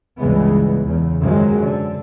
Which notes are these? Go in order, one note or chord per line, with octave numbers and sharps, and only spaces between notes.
C#2 G2 C#3 E3 G#3 B3
E2 C#3
F#2 D#3 F3 F#3 G#3
D3